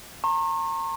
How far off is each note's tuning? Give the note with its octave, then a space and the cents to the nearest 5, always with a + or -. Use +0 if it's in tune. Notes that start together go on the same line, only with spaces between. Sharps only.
A#5 -35 C#6 -45